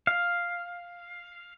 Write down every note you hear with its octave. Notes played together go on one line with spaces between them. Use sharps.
F5